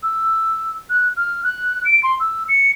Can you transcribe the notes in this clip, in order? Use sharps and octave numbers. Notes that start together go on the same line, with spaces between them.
E6
F#6
F6
F#6
D7
C6
E6
C#7